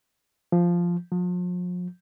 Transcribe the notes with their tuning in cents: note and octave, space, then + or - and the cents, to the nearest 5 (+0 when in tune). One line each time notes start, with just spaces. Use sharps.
F3 -5
F3 +40